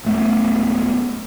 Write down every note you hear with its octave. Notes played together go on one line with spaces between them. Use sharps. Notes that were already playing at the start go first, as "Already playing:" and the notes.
D1 A3 B3